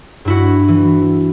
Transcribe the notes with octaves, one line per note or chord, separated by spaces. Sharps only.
G2 E4 F#4
E3